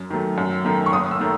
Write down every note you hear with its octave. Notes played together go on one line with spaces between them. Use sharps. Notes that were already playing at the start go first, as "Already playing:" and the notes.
Already playing: F#2
D#3 F#3 A3
F#2
D#3 A3
C#6
F#1 D#6
E6
D#3 A3